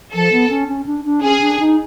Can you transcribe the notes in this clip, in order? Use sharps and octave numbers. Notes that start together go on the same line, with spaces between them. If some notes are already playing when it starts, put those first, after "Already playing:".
F3 A4
B3
C#4
C#4
D4
D4
C#4 G#4
D4
D#4